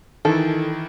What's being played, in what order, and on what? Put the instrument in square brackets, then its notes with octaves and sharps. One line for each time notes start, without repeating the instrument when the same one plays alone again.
[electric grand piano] D#3 E3 E4 [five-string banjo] A4